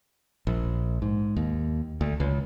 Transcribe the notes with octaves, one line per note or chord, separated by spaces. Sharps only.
A#1
G#2
D#2
D2
C#2